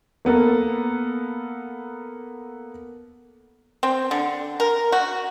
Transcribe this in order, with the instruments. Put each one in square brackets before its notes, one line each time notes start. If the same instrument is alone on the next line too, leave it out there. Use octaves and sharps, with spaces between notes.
[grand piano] A#3 B3 A4 A#4
[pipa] C4
D3
A#4
F#4